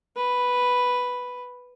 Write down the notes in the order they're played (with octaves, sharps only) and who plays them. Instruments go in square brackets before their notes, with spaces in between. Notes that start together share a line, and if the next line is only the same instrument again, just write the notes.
[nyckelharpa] B4